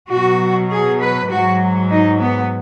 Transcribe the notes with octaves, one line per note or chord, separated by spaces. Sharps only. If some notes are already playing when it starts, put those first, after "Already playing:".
B2 F#3 F#4
G#4
B4
G#2 F#3 F#4
D#4
B3